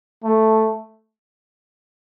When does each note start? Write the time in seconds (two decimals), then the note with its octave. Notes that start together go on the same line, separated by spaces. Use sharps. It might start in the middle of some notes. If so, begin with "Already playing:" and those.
0.24 A3